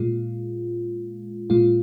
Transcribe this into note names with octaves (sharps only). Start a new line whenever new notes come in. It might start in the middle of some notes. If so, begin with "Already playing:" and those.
Already playing: A#2 G#3 F4
A#2 G#3 F4